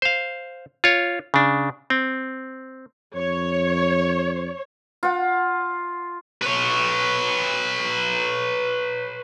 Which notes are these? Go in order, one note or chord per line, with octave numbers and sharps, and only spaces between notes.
C5 F5
F4 C#5
C#3 D4
C4
F2 C#5
F4 F#5
B4 C#5